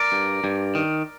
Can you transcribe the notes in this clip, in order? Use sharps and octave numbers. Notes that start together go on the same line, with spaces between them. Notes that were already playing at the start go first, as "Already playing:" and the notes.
Already playing: A#4 D5
G2
G2
D#3